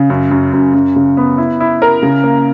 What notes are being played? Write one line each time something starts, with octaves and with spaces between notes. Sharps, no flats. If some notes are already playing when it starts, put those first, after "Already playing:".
Already playing: C#3
F#2
F#2
F#2
F#2
C#3
B3
E4
E4
A#4
C#3
A#3